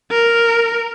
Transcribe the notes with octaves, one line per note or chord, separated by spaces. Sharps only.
A#4